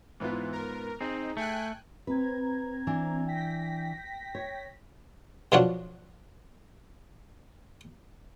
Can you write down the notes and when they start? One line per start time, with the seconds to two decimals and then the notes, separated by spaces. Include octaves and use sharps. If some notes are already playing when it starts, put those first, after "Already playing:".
0.20 G#2 E3 B3 F4
0.52 A#4
1.01 C4 D#4 G#4
1.37 A3 G5 G#5 F#6
2.07 C4 B4 A#5 G#6
2.87 E3 D4
3.27 G5 A#6 B6
4.35 C#5
5.52 B2 F3 F#3 D4 F4 F#4